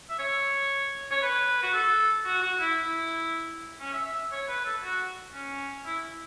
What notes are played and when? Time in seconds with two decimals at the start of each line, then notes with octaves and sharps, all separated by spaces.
0.09 E5
0.19 C#5
1.11 C#5
1.23 B4
1.63 F#4
1.74 A4
2.26 F#4
2.42 F#4
2.60 E4
2.77 E4
3.80 C#4
3.93 E5
4.05 E5
4.18 E5
4.32 C#5
4.48 B4
4.65 A4
4.83 F#4
5.34 C#4
5.86 E4